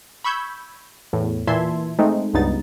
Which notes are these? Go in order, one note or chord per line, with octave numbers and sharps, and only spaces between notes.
B5 C#6 E6 G6 G#6
E2 A2
A#2 E3 E5 A5 C6 G#6
G#3 A3 C4 D#4
C#2 G2 B3 D#4 A6